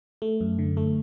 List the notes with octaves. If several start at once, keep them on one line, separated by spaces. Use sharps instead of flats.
A3
F#2
D3
A3